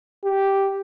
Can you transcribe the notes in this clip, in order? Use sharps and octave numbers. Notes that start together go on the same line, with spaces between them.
G4